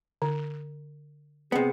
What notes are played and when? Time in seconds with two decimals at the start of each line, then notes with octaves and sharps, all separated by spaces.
0.22 D3
1.52 C3 B3 G#4